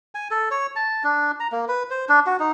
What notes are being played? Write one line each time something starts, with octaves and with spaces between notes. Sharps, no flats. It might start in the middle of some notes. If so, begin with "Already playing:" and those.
G#5
A4
C#5
A5
D4
A#5
A#3
B4
C5
D4
F#4
D#4